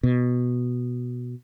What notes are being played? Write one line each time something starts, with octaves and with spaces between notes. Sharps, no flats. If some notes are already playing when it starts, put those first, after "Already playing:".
B2